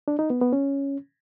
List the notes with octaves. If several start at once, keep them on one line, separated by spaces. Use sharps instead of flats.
D4
D#4
B3
B3
C#4